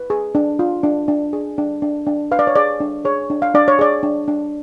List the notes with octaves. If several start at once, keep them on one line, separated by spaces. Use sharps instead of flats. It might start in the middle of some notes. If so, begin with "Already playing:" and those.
Already playing: B4
G#4
D4
F4
D4
D4
G#4
D4
D4
D4
B4 F5
D5
C#5
G#4 D5
D4
G#4 C#5
D4
F5
D4 D5
C#5
G#4 D5
D4
D4